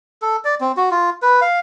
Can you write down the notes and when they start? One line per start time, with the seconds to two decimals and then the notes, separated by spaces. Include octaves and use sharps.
0.22 A4
0.45 D5
0.61 C4
0.77 F#4
0.91 F4
1.22 B4
1.42 F5